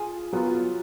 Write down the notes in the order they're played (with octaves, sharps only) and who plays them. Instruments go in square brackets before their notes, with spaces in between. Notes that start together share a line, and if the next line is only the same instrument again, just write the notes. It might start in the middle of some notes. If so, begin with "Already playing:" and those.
Already playing: [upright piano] F4 [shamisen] G#4
[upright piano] F#3 B3 F4